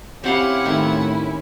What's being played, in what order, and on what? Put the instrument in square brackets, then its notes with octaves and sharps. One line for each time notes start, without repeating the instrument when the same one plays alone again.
[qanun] C4 G4 F5 [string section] C#4 E4 [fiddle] F#5
[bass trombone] A2 [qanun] D#3 C4